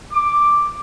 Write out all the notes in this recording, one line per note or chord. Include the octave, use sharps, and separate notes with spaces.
D6